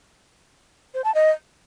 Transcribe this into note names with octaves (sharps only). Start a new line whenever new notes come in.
C5
A5
D#5